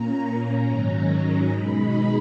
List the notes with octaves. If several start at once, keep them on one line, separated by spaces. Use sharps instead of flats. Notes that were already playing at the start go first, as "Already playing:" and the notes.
Already playing: A#2 A#3 C#4 A#5
G#2 D#3 F#3 C#4 A#5
B2 G#3 D#4 B5